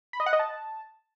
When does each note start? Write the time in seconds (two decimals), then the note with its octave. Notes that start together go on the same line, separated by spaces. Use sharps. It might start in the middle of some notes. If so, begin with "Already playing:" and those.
0.13 B5
0.20 D#5
0.26 F#5
0.33 D#5
0.39 A5